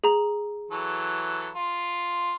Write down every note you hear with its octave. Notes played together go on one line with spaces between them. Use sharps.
G#4 A#5
E3 F#3 A4
F4